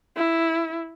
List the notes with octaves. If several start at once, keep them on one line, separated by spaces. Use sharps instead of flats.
E4